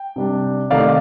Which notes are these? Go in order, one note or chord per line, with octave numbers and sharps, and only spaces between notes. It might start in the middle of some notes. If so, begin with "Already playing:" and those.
Already playing: G5
C3 G3 D4
C3 D#3 A3 D#4 D5 F5